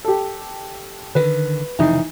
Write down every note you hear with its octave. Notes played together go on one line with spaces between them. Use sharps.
G4 A4
D3 D#3 B4
F1 C#3 E3 D#4